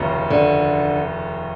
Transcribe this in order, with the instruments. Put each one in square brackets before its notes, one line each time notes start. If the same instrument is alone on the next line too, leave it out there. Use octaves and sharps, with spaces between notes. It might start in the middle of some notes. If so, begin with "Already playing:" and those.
Already playing: [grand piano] F1 D#2 C#3 F#3
[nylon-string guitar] D3